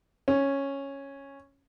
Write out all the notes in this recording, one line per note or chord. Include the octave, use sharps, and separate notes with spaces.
C#4